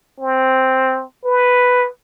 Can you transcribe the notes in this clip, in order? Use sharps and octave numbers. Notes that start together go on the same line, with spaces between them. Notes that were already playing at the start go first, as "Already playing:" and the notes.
C4
B4